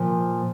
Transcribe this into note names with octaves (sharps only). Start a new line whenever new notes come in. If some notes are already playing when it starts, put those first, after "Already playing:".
Already playing: A#2 F3 A#3